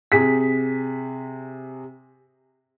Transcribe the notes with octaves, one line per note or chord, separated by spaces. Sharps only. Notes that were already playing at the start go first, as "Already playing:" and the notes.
C3 G#4 B6